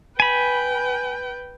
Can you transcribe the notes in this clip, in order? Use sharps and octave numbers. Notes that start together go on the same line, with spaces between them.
B4 G5 G#5 B5